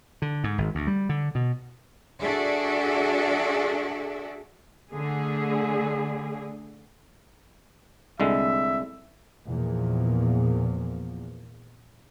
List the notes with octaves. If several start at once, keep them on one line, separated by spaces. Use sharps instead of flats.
D3
G#2
G#1
D2
G3
D3
B2
D4 F#4 G#4 A4 D5 E5
D3 A3 G#4
C2 D3 G#3 E5
E2 A#2 F3